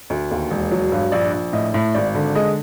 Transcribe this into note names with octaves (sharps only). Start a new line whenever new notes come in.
D2
D#2
E1
F#3
G2
A#1 D5
A#1
A2 D#5
A2
G#1 D5
D3
G#3 D#5